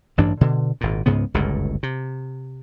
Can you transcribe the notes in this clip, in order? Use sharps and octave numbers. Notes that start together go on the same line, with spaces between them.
A1 G2 E3 D4
B2 D3
G#1 A#2
C#2 G#2 C#3 B3
G1 C#2 F#2 A2
C3